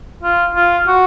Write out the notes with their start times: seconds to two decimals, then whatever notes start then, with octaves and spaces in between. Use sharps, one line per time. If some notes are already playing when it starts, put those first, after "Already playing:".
0.24 F4
0.55 F4
0.87 F#4